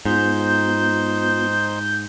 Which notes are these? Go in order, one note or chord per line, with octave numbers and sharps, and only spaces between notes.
G#2 B3 D#4 F4 C5 G6